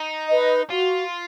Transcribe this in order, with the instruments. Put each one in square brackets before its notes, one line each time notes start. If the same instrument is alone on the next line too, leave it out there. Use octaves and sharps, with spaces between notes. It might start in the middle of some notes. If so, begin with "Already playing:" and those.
Already playing: [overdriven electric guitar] D#4
[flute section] B4 D#5
[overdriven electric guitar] F4 [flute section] F#4